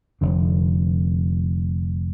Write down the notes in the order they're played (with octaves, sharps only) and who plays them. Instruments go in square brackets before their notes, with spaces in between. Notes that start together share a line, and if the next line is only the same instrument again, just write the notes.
[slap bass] F1 F2 D3